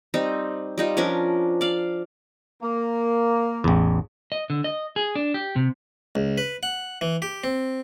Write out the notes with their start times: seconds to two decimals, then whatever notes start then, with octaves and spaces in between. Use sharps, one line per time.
0.14 G3 C4 D#4
0.78 G3 D#4 F4
0.97 F3 C#4 D4 A#4
1.61 D5 F5
2.62 A#3
3.64 A1 E2
4.32 D#5
4.50 D3
4.64 D#5
4.96 G#4
5.15 D4
5.34 G4
5.56 C3
6.15 C#2
6.38 B4
6.63 F#5
7.01 E3
7.22 G4
7.44 C4